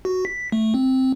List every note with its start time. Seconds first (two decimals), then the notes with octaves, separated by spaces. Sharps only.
0.05 F#4
0.25 B6
0.52 A3
0.74 C4